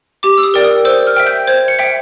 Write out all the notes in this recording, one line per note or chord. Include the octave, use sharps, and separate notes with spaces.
G4 D6
E6
D#6
A#4 D5 G5
D#6
C5 E6
F6
E5 G5
G6
C5 G#6
C#7
E5 G5